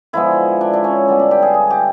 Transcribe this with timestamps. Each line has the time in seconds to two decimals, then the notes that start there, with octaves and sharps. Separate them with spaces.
0.13 D3 F3 G#3 B3 E4
0.61 D4
0.73 D4
0.84 C#4
1.08 D3 G3 B3 D4
1.19 D4
1.31 G4
1.42 G#4
1.54 G#4
1.70 G4